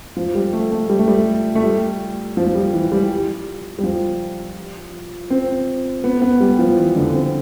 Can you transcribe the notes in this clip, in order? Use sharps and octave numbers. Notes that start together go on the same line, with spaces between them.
F3
G3
A3
A3
G3
A3
G3
A3
G3
F3
F3
G3
E3
G3
G3
F3
C4
B3
B3
G3
F3
E3
D3
C4